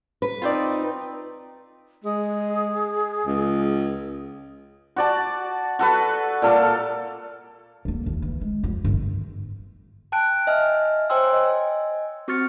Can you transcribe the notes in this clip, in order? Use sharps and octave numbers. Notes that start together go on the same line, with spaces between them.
B4
C4 D#4 F4 C5 D5
G#3 G#4
C#2
F#4 D5 A5
F#4 A4 B4
A#2 A4 F5 D6
F2 A#3
D#2
E3
G#3
F2
G1 E3
G5 A5 F#6 D7
D#5 E5 G#5 F6
C5 C#5 G5 G#5 C6 E6
D#5 G#5
C4 F#4 C#6 F6 A6 C#7